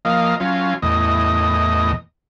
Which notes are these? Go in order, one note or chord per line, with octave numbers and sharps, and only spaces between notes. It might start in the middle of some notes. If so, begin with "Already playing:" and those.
F3 A#3 D#5 F5
F#3 C#4 F4
E2 A2 D#5